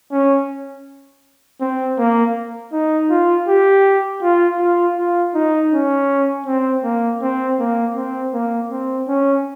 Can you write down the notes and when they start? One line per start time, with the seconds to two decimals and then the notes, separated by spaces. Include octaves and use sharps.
0.12 C#4
1.61 C4
1.98 A#3
2.72 D#4
3.10 F4
3.48 G4
4.23 F4
4.60 F4
4.97 F4
5.34 D#4
5.72 C#4
6.47 C4
6.84 A#3
7.22 C4
7.59 A#3
7.96 C4
8.33 A#3
8.71 C4
9.08 C#4